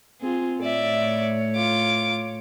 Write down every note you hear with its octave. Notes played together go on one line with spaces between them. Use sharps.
C4 F4 G#4
A2 C#5 D5 E5
F4 D6